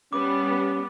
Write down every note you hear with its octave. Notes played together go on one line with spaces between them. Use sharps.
G3 B3 C#4 D6